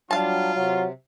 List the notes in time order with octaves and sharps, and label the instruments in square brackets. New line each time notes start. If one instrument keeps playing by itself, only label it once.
[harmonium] F#3 G3 D4 [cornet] F4 [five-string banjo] F5 A5
[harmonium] C3 [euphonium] F#3